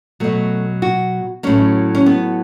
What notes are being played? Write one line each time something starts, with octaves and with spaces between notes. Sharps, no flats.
B2 F#3 A3
F#4
A2 F#3 C#4
C#4
B3